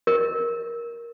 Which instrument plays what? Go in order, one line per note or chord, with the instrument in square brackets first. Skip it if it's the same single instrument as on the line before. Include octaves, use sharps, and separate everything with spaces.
[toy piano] A#4